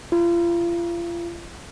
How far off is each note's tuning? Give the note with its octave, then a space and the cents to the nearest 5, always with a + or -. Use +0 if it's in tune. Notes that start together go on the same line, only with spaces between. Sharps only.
F4 -35